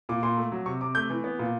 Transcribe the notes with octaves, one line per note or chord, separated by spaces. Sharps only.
A#2 D6
A#2 C6
A3
F#3
C3 C#6
C3 D6
A3 G6
E3
B3
A#2